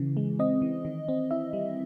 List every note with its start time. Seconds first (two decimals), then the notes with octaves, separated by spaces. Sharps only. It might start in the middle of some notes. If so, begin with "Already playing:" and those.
Already playing: C#3 E3
0.17 G#3
0.39 C4 D#5
0.62 E3
0.85 D#3
1.08 C4
1.31 E4 E5
1.53 G3